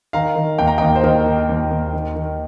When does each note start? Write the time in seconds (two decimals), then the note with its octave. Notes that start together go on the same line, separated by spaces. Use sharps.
0.13 D#3 F5 A#5
0.36 D#3
0.59 D#2 G5
0.68 A#5
0.78 D#2 D#5 G5
0.96 C5
1.04 D#3 A#4 D#5
1.26 D#3
1.49 D#2
1.71 D#2
1.93 D#3
2.16 D#3